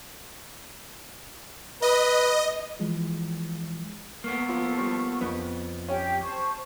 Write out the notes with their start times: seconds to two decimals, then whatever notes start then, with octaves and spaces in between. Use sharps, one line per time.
1.82 B4 D#5
2.79 E3 F3 G#3
4.24 A#3 B3 A4 C#6
4.49 F3
4.78 F3 G3
5.21 F2 B3
5.89 C#4 G4 G5
6.23 C5 A5 C#6